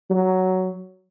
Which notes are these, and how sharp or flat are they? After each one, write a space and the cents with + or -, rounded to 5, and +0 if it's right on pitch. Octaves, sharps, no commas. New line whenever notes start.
F#3 +10